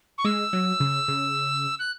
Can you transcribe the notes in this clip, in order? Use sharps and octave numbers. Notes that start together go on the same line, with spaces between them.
C#6
G#3 E6
F#3
C#3
C#3
F#6